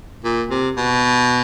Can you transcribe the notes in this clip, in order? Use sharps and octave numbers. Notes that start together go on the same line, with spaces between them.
A#2
C3
B2